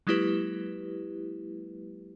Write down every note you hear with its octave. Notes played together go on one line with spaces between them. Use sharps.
F#3 G#3 A#3 E4 G4 B4